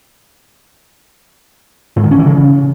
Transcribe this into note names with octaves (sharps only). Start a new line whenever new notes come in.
G#2
D#3
C#4
E3
C#3